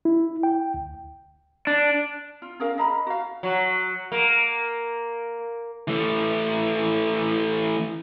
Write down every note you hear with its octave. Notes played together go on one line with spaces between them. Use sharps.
E4
G5
D2
D4
F4
C#4 G#4 A#4 F5
D#5 A#5 B5
F#4 F5
F#3
A#3
E3 A3